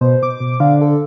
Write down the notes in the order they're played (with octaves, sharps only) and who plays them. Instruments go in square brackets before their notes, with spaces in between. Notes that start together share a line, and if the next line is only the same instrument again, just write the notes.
[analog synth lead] B2 [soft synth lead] C5
[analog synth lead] D6
[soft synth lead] B2
[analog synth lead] D3 [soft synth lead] F5
[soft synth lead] A4